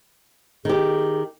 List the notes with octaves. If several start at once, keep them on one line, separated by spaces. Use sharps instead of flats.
D#3 G4 G#4